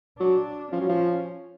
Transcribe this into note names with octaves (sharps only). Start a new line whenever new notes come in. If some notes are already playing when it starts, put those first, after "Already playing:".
F#3 D4
F3 C#4
F#3
F3